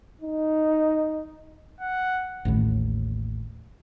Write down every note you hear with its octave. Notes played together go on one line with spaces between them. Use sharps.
D#4
F#5
A1 D#2 A2